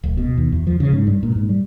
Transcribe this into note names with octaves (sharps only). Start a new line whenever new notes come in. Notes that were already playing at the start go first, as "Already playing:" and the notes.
D1
B2
D#2
E2
F3
C#3
G#2
G2
A#2
G#2
G3